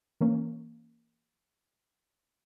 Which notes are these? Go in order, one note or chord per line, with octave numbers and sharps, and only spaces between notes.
E3 A#3 C#4